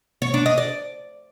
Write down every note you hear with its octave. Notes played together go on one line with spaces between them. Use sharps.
C#5
D4
D#5
D5